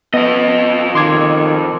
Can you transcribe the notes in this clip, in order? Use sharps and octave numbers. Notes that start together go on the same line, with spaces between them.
F2 B3 D#5
D#3 C6 D6 G#6